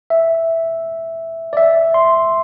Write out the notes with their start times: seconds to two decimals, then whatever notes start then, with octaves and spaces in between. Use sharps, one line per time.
0.10 E5
1.53 D5
1.57 E5
1.94 C6